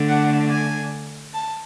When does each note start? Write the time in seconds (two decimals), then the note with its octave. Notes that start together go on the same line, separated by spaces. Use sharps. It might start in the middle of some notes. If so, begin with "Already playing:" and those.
Already playing: D3 A3 D4
0.08 F#5
0.50 G#5
1.33 A5